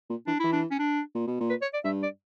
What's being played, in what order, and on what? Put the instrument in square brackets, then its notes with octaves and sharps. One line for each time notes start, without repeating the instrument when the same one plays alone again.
[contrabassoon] A#2
[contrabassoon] E3 [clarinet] D4
[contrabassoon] E3 [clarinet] E4
[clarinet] D4
C#4
D4
[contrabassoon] A#2
B2
A#2
[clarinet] B4
C#5
D5
[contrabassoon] G2 [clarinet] E5
[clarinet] D5